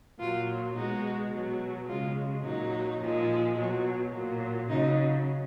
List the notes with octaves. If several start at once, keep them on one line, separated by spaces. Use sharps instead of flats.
A#2 F#3 F4
B2 G#3 D#4 F#4
B2 F#3
C#3 G#3 F4
A#2 F#3 D#4
A#2 F3 G#3
B2 F#3
A#2 F#3
C#3 F#3 D#4